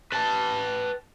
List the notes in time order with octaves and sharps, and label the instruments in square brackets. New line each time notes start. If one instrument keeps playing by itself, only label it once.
[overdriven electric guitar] B4 A5